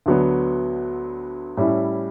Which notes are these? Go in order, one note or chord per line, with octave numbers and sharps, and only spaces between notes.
D2 D3 F#3 B3
A2 G3 C#4 E4